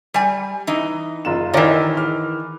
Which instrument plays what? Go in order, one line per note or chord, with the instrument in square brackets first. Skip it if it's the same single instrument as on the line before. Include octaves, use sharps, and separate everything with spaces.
[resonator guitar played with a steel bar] G3 G#5
E3 D#4
[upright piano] F#1 F4 E7
[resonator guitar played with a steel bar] D#3 E3 [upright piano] A#4 D5 D#5
[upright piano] D6 F6